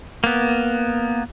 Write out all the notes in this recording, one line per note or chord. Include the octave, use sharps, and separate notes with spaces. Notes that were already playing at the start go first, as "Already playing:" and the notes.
A#3 B3